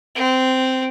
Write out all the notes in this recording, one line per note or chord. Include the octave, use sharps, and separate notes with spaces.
C4